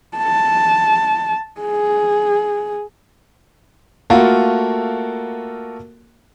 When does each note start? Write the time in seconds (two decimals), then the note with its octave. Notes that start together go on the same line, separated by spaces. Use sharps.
0.17 A5
1.61 G#4
4.10 A3 A#3 F4 F#4 A4 A#4